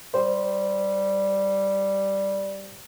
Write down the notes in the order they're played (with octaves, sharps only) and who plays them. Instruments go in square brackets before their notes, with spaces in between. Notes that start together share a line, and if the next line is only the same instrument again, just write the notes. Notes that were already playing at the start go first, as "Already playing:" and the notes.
[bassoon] G3 [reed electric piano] C5